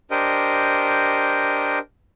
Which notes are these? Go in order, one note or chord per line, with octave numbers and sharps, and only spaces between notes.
D4 G4 A#4 C5 D#5